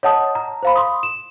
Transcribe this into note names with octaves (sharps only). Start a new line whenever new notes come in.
C#5 D#5 F#5 A5 D#6
A#5
C5 F5 B5
C6 D#6
E7